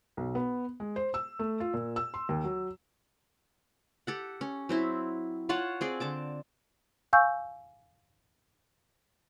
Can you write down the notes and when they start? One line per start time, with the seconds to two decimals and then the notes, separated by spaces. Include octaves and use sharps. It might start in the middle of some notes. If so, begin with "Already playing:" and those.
0.17 B1
0.35 B3
0.80 G#3
0.96 C5
1.14 E6
1.39 A3
1.60 F4
1.74 A#2
1.96 E6
2.14 C6
2.29 D#2
2.44 F#3
4.07 G4 A4 F#5
4.41 C#4
4.69 F#3 C4 E4
5.49 F4 C#5 F#5 A5
5.81 C4 G#4 D5
6.00 D3 A5 D6
7.13 F5 G#5 C#6 E6 G6